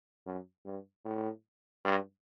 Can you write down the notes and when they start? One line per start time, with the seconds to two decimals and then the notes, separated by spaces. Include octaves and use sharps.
0.26 F#2
0.65 G2
1.05 A2
1.85 G2